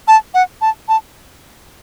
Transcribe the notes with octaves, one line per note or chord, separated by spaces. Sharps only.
A5
F#5
A5
A5